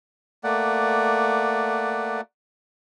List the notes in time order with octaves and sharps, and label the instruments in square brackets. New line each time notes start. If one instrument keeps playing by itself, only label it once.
[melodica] A3 A#3 D5 F#5